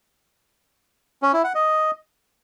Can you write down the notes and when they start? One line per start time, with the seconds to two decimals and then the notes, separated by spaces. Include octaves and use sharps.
1.23 C#4
1.33 E4
1.44 F#5
1.55 D#5